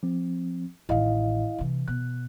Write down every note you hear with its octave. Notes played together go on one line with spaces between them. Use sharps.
F3 C4
A1 D#3 E4 D#5 F5
C3 E3
B2 F#6